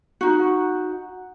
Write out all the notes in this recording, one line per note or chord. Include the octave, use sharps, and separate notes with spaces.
D#4 F#4